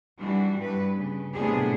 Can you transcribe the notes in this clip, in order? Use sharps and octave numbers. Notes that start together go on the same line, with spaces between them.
E3 G3 D4 F#4
G2 B4
C#3
A2 C3 B3 C4 D4 G#4